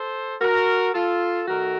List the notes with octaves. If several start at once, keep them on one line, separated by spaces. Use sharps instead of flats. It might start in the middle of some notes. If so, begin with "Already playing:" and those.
Already playing: A4 C5
F#4 A#4
F4 A4
D#3 A3 F#4 A#4